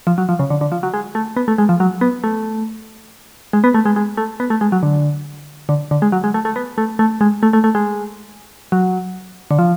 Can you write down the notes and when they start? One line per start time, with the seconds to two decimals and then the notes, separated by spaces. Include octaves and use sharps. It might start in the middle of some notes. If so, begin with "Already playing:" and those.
0.07 F3
0.18 F#3
0.29 F3
0.39 C#3
0.50 D3
0.61 D3
0.72 F3
0.83 F#3
0.94 G#3
1.15 A3
1.37 B3
1.48 A3
1.58 G#3
1.69 F3
1.80 F#3
2.01 B3
2.24 A3
3.53 G#3
3.64 B3
3.74 A3
3.85 G#3
3.96 G#3
4.17 A3
4.40 B3
4.50 A3
4.61 G#3
4.72 F#3
4.83 D3
5.69 D3
5.91 D3
6.02 G#3
6.12 F#3
6.24 G#3
6.34 A3
6.45 A3
6.56 B3
6.78 A3
6.99 A3
7.21 G#3
7.43 A3
7.53 A3
7.64 A3
7.75 G#3
8.72 F#3
9.51 D3
9.59 F3